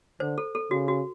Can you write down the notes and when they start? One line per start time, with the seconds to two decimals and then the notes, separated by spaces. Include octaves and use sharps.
0.20 D3 C5
0.38 A4
0.55 A4
0.71 C#3 F#4
0.88 F#4